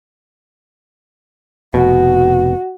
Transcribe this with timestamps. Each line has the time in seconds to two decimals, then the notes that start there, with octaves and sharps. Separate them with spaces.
1.74 F1 B2 F#4